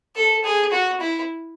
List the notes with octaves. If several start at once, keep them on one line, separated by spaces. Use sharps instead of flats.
A4
G#4
F#4
E4